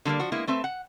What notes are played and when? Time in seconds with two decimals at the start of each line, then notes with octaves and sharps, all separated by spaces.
0.05 D3 G3 A3 A#3
0.20 F3 D4 F#4
0.32 G#3 A#3 B3 E4
0.47 A3 C4 B4 E5
0.64 F#5